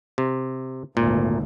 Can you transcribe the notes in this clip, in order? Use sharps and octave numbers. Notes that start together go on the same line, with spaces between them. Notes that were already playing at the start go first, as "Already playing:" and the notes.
C3
G#1 D2 A#2